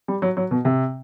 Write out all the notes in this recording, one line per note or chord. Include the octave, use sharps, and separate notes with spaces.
G3
F#3
F#3
B2
C3